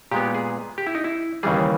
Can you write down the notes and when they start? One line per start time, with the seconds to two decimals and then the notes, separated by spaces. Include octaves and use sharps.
0.11 A#2 G#3 B3 G4
0.35 G#4
0.78 G4
0.87 E4
0.95 D#4
1.04 E4
1.43 D#2 C#3 E3 G3 G#4